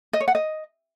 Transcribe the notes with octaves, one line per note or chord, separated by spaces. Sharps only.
D#5
C#5
F#5
D#5